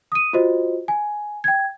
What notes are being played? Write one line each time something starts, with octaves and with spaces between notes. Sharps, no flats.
D#6 D#7
F4 F#4 C5 D#5
G#5
G5 G#6